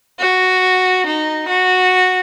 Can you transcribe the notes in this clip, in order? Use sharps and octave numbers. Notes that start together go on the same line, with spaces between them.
F#4
D#4
F#4